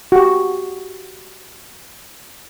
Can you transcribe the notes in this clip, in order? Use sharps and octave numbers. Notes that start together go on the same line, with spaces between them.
F#4 G4